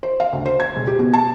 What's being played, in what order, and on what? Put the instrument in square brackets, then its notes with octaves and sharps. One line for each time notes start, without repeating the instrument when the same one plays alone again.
[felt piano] C5
F5
D2
C5
G#6
E1
G4
B2
A5